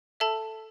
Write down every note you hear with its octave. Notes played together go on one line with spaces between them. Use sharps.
A4 E5 A5